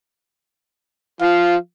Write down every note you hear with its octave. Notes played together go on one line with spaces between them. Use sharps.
F3 F5